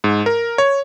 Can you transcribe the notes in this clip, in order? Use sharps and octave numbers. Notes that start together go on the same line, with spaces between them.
G#2
A#4
C#5